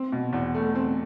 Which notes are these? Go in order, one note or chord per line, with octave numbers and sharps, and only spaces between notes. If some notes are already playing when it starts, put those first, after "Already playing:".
Already playing: C4
B2
E2
A3
C4